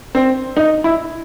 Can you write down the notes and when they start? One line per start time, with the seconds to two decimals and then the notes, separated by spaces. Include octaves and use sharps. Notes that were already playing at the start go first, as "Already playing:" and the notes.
0.15 C4
0.57 D#4
0.84 E4